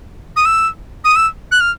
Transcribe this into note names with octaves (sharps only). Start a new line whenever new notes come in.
D#6
E6
D#6
E6
F#6
F6